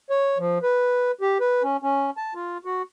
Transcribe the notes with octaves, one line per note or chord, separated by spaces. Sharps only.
C#5
F3
B4
G4
B4
C#4
C#4
A5
F4
F#4